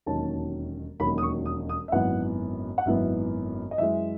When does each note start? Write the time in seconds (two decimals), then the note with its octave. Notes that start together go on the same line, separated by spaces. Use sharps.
0.06 E1 D#2 D#3 F#3 C#4 A5
1.00 E1 D#2 D#3 F#3 C#4 B5
1.18 D#6
1.23 C#6
1.46 D#6
1.69 D#6
1.88 E5
1.92 G#1 F#2 E3 B3 F#5
2.78 F#5
2.85 G#1 F#2 E3 B3 E5
3.71 D#5
3.78 F#2 E3 G#3 E5